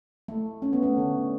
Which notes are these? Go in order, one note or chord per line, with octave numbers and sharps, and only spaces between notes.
A3
C#4
B3
A3 C#4
D3